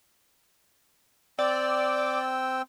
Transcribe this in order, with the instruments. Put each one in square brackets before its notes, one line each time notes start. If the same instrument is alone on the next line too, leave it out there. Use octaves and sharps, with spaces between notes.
[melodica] C4 G5 E6 [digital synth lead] D5